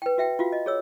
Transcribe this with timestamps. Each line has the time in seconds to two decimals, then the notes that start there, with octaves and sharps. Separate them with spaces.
0.02 B4 G5
0.18 F#4 E5 G5
0.39 F4 F#4 F5
0.52 D#5
0.66 G#4 C#5 E6